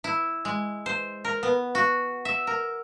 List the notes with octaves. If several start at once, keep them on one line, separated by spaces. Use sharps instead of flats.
E4
G#3
C5
A#4
B3
F#4
E5
A#4